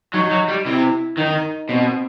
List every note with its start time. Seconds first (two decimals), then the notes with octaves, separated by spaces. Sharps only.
0.14 F#3 D#4
0.31 F#3
0.48 G3
0.66 C3 E4
1.17 D#3 D#4
1.69 B2 C4